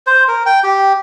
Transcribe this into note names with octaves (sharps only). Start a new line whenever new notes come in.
C5
A#4
G5
G4